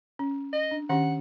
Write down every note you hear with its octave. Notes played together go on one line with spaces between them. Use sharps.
C#4
D#5
D4
D#3 C#4 G4 F#5